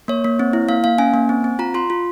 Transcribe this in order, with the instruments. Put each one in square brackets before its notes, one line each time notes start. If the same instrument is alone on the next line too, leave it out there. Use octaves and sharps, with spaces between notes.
[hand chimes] A#3 C#5
A#3
C4
E4
A#3 F5
A#3 F5
C#4 G#5
A#3
C4
C4
F4 A#5
F4 C6
F4